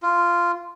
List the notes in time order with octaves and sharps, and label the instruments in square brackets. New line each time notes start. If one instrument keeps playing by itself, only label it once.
[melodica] F4